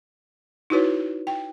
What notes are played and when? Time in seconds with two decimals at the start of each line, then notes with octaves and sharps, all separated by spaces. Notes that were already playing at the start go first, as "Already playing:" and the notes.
0.70 D#4 E4 F#4 B4 C#5
1.27 G5